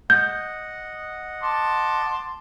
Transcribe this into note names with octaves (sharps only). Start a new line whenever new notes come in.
D#5 F#5 G6
A5 C6 D6